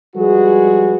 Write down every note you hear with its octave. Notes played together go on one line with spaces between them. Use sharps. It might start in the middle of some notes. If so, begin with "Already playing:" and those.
F3 G3 G#3 F#4 G#4 B4